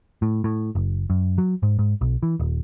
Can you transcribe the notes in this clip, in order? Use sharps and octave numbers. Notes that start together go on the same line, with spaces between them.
A2
A2
F#1
F#2
F#3
G#2
G#2
B1
E3
D#1